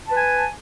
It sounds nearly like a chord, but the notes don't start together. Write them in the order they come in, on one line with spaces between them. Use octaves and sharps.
A5 B4 G#5